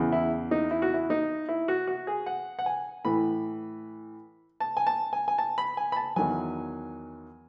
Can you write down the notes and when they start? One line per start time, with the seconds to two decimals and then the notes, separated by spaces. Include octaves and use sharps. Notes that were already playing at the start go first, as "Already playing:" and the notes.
Already playing: E2 C#3 E3
0.12 E4
0.51 D#4
0.71 E4
0.82 F#4
0.94 E4
1.10 D#4
1.49 E4
1.68 F#4
1.87 F#4
2.07 G#4
2.26 F#5
2.59 F#5
2.66 G#5
3.05 A2 E3 B5
4.60 A5
4.77 G#5
4.87 A5
5.13 G#5
5.28 G#5
5.38 A5
5.58 B5
5.77 G#5
5.92 B5
5.97 A5
6.16 E2 D#3 F#3 G#5